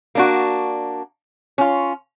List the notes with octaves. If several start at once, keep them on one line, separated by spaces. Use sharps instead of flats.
A#3 D4 F#4
C#4 F4